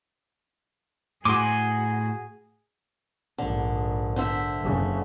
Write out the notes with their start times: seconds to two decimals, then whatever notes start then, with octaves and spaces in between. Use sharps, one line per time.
1.25 A2 F#4 G#4 G#5 C6 D6 D#6
3.38 A#1 G#2 D3
4.16 D3 C5 E5
4.61 F#1 C#3